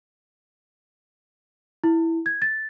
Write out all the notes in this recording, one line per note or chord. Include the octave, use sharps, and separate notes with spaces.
E4
G#6
A6